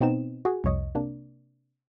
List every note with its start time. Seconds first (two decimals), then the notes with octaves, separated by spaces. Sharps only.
0.01 B2 B3 C4 D#4 E7
0.45 F#4 G#4
0.64 C2 F2 C#5 D#5
0.95 C3 A#3 D4